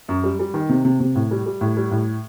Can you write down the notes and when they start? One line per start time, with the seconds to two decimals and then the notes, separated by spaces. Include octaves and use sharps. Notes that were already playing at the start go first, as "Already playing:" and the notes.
0.09 F#2
0.24 G3
0.39 G3
0.54 D#3
0.69 C3
0.85 C3
1.00 C3
1.15 A2
1.31 G3
1.46 G3
1.61 A2
1.77 G3
1.91 A2